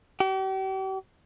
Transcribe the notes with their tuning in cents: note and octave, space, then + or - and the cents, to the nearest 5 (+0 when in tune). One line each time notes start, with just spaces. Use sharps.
G4 -40